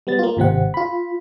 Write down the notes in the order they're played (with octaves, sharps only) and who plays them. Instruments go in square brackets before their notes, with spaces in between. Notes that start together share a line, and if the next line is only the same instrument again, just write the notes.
[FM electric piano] G3 B3 A6
A#3 F4
G#1 C3 C4 F#5
F4 B5